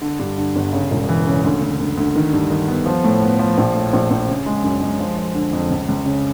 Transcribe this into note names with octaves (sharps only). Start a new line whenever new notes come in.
D3
G2
D3
G1
C#3
E1
E3
C#3
D2
D2
D2
D2
D#3
G2
D#3
B3
F3
A2
B3
F3
A#1
A2
A#1
A#1
C#3
G#3
F#2
G#3
F3
F3
D3
F2
C#2
C#2
C#3